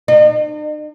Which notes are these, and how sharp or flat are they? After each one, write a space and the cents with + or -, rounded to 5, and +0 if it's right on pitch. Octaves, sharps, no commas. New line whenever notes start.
D#4 -45